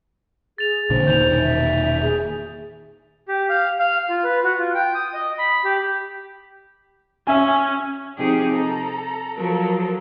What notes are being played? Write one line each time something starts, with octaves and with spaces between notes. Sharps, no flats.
G#4 A6 F7
A#1 A#2 D3 C5
E1 A#2 D#3 G6 F7
E5
G#4
G4
F5
F5
F4
B4
F#4
F4
G5
D#6
D#5
B5
G4
C#4 E5 G#5
C3 F3 D#4 G4 G#4
A4 A#5
F3 F#3 A4 A#4